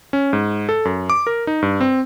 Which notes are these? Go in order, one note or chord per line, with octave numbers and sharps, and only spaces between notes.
C#4
G#2
A4
F#2
D6
A#4
D#4
G2
C4